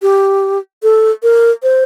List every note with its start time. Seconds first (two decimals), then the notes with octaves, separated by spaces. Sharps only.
0.02 G4
0.83 A4
1.23 A#4
1.63 C5